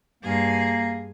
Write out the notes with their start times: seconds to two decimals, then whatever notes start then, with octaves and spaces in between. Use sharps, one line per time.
0.23 G2 A#3 G#4